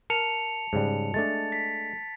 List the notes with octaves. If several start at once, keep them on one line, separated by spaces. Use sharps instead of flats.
A#4 A5 C#7 F7
G#2 C#3 G3
G#3 A3 D4 A6
B6